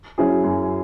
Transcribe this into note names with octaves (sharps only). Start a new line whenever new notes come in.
F#3 C#4 E4 G#4
F#2